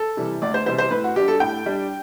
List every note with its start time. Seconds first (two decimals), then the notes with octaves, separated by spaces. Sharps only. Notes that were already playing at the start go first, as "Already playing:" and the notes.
Already playing: A4
0.17 C3 E3 G3
0.42 D2 D5
0.54 C5
0.66 C3 E3 G3 C5
0.78 C5
0.91 A2 B4
1.04 F#4
1.16 G3 D4 G4
1.28 A4
1.40 A2 G5
1.66 G3 D4